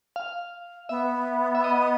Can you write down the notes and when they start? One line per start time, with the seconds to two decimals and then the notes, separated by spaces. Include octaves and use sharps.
0.16 F5
0.89 B3 E5
1.55 E5
1.64 D#5
1.83 D#5